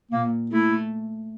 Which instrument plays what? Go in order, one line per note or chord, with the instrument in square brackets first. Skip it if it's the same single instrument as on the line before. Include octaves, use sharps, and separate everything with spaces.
[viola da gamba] A#2 [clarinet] A#3
[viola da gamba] A3 [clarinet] E4